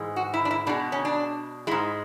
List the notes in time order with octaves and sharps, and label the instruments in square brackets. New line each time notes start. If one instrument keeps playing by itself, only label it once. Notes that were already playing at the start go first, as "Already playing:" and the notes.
Already playing: [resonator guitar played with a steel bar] G#2 E3 G#3
F#4
E4
D4
E4
B2 G#3 D4
C#4
D4
G#3 E4
G#2